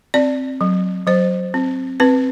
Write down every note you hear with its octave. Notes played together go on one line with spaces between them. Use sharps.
C4 D5
F#3
F#3 C5
C4
C4 B4